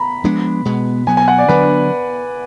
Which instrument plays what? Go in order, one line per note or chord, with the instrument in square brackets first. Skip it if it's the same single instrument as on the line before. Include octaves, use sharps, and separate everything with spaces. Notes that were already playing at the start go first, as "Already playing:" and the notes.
Already playing: [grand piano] A#5 B5
[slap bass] F3 G#3 B3 D4
B2 G#3 B3
[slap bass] B2 F#3 B3 [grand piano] G#5
[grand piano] G#5
F#5
D5
[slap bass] D3 F#3 B3 D4 [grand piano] B4